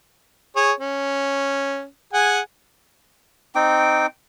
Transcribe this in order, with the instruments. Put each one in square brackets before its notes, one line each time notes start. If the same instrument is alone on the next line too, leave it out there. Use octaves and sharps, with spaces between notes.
[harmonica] G#4 C#5
C#4
G#4 F#5 G#5
[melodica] C4 D#4 G5 D6